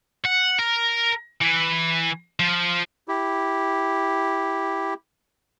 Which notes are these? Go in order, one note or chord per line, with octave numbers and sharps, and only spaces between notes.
F#5
A#4
E3
F3
E4 G4